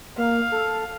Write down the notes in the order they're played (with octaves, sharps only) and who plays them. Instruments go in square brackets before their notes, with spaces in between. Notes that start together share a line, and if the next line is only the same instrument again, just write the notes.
[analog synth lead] A#3 [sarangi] F5
[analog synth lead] A4